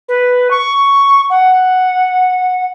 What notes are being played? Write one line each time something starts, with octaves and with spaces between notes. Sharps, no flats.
B4
C#6
F#5